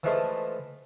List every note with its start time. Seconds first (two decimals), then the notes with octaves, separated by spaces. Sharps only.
0.03 E3 F3 G#3 A3 E4 F4